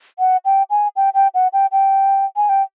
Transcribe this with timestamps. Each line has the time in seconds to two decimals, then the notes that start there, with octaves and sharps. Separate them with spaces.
0.19 F#5
0.45 G5
0.70 G#5
0.96 G5
1.14 G5
1.34 F#5
1.53 G5
1.72 G5
2.36 G#5
2.49 G5